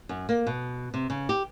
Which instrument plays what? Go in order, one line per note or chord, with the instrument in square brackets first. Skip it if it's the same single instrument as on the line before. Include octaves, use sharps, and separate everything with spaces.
[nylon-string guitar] F#2
A#3
B2
C3
C#3
G4